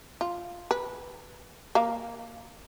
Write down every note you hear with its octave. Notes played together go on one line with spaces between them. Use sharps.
F4
B4
A#3 F5